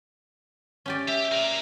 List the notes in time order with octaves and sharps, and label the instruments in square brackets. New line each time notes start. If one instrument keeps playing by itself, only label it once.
[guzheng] C#4 G4 D5
[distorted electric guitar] G4 [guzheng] E5
[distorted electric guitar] A#4 D5